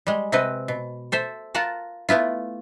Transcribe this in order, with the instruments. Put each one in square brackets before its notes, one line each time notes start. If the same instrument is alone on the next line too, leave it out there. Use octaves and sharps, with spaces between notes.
[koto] G3 G#3
C3 C4 B4 D#5 F#5
B2
A4 C5 E5
F4 A#4 F#5 A5
A3 B3 E4 F4